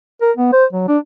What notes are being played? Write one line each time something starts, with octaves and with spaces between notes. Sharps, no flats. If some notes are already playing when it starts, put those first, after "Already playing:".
A#4
B3
C5
F#3
D4